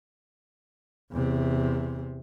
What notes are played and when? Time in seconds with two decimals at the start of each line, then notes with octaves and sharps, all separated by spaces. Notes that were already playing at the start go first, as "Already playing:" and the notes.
1.12 E2 C3